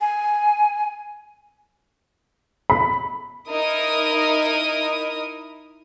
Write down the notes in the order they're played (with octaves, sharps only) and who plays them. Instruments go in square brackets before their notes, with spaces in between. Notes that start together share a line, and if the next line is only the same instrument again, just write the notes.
[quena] G#5
[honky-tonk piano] B5
[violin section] D#4 E4 A#4 D#6